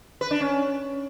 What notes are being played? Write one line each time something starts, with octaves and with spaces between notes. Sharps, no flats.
B4
D4
C#4